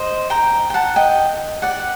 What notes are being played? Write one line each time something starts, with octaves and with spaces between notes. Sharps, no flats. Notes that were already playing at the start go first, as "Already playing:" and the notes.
Already playing: C5 D#5
G5 A#5
G5
F#5 A5
D#5 G5
D5 F#5